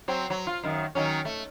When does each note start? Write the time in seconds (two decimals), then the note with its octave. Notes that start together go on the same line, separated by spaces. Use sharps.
0.08 F#3 C4
0.30 F#3
0.47 F4
0.63 F#2 D#3
0.95 D#3 F#3 C#4
1.25 A3